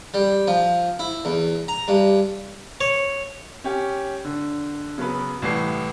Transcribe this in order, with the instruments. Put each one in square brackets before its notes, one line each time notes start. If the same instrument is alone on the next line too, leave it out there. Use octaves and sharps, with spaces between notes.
[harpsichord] G3
F3
E4
E2
A#5
G2
C#5
[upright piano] C#4 G4
D3
C#3 F#3 B3 B4
C2 A2 E3 C7